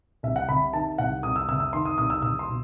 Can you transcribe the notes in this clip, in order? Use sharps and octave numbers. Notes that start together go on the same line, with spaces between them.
C2 E5
F#5
C3 B5
D#3 A5
C2 F#5
C2 D#6
E6
C3 E6
E6
D#3 C6
D#6
C2 D#6
E6
C2 E6
C6
B2